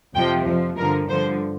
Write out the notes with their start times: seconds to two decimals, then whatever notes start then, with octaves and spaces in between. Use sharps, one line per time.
0.15 F2 C3 F3 G5
0.46 F2 F3
0.77 G2 D3 F3 A#4
1.08 G2 D3 F3 C5